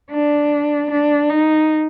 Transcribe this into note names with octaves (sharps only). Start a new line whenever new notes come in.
D4
D4
D#4